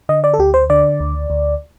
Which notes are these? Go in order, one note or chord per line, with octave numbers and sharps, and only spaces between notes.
D3 D#5
D5
A4
D2 G4
C5
D3 D5
D2
D2